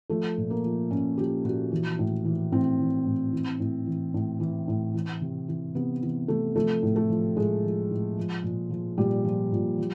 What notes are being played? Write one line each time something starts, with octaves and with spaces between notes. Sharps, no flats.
F3 A3
A#2
A#3
F3
A#2 C#4
F3 G4
A#2 F#4
E3
A2
E3
A2 C4
E3
A2
E3
A2
E3
A2
E3
A2
E3
C3
E3
C3 B3
E3
C3 A3
F3 A3
A2
A3
F3
A2 G#3
F3
A2
F3
A#2
F3
A#2 G3
F3
A#2
F3